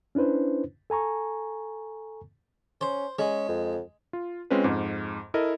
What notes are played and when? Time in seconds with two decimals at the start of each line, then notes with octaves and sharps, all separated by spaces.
0.15 C#4 D4 E4 B4 C5
0.90 A4 G#5 A#5 C#6
2.81 C#4 C5
3.19 G#3 C#4
3.49 F2
4.13 F4
4.50 G#3 C4 C#4 F4 B4
4.64 F2 G#2
5.34 E4 A4 A#4 D#5